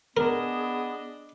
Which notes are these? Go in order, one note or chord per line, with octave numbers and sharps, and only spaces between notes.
B3 D4 G#4 A#4 D#5